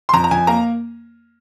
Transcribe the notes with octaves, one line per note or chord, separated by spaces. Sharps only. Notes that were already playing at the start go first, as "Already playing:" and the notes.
C6
F2 A#5
A#5
F2 G#5
A#3 A#5